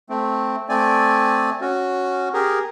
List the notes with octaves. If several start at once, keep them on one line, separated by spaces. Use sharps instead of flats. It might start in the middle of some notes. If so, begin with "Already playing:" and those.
A3 C4
A3 C4 D5 G#5
C#4 F#4
G4 G#4 A#4